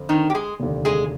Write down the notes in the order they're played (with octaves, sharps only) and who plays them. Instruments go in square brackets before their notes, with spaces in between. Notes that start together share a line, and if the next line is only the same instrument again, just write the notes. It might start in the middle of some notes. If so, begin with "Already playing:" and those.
Already playing: [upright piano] F2 D3
[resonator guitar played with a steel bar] D#3 D#4
G4
G#3 G#4
[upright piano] F1 D#2 D3
[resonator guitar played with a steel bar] G#3 G#4